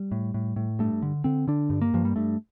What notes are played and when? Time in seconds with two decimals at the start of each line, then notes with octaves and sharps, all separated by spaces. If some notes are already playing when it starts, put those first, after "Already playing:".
Already playing: G3
0.12 A2
0.34 A2
0.56 A2
0.79 G2 A3
1.02 D3
1.24 D3 C4
1.47 D3 D4
1.70 G2
1.81 A#3
1.94 G2 F3
2.05 G3
2.16 G2 A3